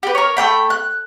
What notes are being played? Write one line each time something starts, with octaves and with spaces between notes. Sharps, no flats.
G4 B4
A#4 C#5
A3 A#3 G5 B5
F#6